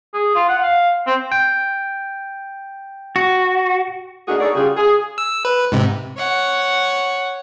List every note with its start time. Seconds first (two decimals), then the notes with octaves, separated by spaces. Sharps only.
0.13 G#4
0.35 F4
0.49 F#5
0.62 F5
1.07 C4
1.32 G5
3.16 F#4
4.28 A3 A#3 D4 D#4 F#4 G#4
4.39 D#4 G#4 A4 C#5 D5
4.54 C#3 G3 F4 F#4 G#4
4.77 G#4
5.18 E6
5.45 B4
5.72 G#2 C3
6.17 C#5 F#5